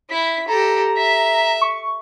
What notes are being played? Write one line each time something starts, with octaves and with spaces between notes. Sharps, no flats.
E4 B6
G4 A4 A#5
E5 B6
C#6